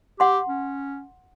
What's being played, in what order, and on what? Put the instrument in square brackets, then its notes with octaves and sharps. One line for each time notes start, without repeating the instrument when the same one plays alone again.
[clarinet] G4 [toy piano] F#5 C6
[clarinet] C#4